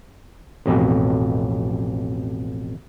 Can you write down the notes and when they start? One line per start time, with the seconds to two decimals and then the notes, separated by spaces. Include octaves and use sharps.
0.66 A1 F2 B2